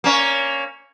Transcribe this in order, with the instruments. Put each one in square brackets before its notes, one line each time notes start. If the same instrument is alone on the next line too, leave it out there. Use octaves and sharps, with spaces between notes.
[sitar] A#3 C#4